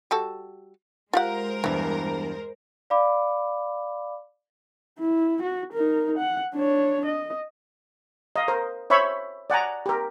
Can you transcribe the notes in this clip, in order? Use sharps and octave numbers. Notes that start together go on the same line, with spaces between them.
G3 F#4 A4
G#3 F4 G4 A#4 C5 F#5
E2 G2 E3 G3
D5 F5 B5 D6
E4
F#4
D#4 A#4
F#5
D4 C#5
D#5
D#5 F5
A#4 C5
C5 C#5 E5 B5 C#6
D5 F#5 G#5 A#5
G4 A#4